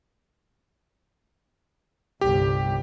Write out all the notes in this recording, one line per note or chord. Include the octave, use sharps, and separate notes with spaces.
G1 C2 G4